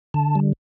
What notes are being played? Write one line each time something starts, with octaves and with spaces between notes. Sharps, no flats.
D3 A5
G3